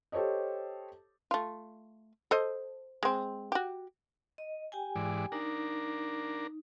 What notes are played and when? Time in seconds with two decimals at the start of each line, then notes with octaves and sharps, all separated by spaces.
0.12 G4 A4 C5 C#5 D#5
1.31 A3 F4
2.31 A4 C5 D#5
3.03 G#3 C4
3.52 F#4 G4
4.38 D#5
4.72 G4 G5 G#5
4.96 G#2 E3 D5
5.32 D4 D#4 A#4